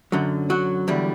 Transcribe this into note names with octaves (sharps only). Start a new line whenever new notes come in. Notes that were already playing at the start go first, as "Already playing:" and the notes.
F#2 D3 F#3
F#3 F#4
E2 D3 G3